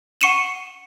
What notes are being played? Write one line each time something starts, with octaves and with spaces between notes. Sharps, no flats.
F#5 C#6 C#7 D#7 E7 F#7